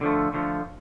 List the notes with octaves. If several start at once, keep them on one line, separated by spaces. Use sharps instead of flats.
D3 F3 A3
D3 F3 A3